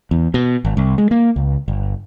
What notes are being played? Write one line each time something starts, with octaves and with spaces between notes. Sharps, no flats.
E2
B2
G#1
C2
G#3
A#3
C#2
G1